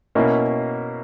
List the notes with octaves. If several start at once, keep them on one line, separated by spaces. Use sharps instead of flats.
B2 A#3 C#4 E4